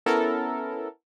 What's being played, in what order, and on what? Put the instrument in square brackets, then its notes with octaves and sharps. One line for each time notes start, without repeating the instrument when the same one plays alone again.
[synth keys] B3 C#4 E4 A4 A#4